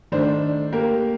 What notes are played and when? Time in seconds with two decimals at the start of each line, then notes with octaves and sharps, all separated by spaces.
0.12 D#3 A3 D4 C5
0.72 A#3 G4 A#4